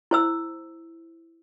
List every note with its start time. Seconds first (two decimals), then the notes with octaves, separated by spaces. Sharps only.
0.11 E4 C5 E6